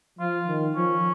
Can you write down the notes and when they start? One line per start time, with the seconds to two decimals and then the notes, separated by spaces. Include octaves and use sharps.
0.19 F3 F4
0.48 D#3
0.76 F3 C#4